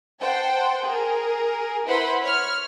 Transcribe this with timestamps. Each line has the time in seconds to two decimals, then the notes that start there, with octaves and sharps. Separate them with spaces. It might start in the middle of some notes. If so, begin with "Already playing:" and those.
0.20 C5 F#5 G5 A5
0.83 G#4 A#4
1.86 E4 B4 C5 F#5 B5
2.22 C#5 F6